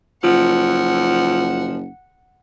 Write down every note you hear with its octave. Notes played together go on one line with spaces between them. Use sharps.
F#1 F3 F4 F#5